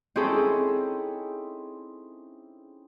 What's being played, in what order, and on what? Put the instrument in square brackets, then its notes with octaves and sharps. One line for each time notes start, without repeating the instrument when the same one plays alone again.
[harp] C4 C#4 D#4 E4 G#4 A4